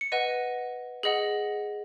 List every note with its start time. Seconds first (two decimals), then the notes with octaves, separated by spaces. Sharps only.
0.01 C#7
0.12 B4 D#5 F#5 D#7
1.03 G#4 D#5 F#5 F#7